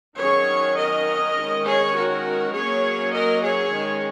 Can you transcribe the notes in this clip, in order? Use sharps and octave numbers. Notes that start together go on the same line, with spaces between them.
D#3 F#3 C#4 G#4 C#5
A#4 D#5
D#3 G#3 C#4
G#4 C#5
F#4 A#4
F#3 A#3 C#4 G#4 C#5
A#4 D#5
G#4 C#5
D#3 G#3 C#4